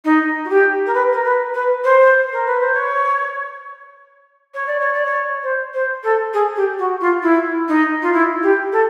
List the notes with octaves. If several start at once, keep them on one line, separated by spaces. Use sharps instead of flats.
D#4
F#4
G4
A#4
B4
A#4
B4
B4
C5
A#4
B4
C5
C#5
C#5
D5
C#5
D5
C#5
C5
C5
A4
G#4
G4
F#4
F4
E4
D#4
F4
E4
G4
A4